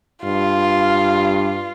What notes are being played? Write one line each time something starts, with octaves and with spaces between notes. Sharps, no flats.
G2 F4